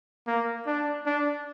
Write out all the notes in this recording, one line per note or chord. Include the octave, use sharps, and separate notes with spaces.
A#3
D4
D4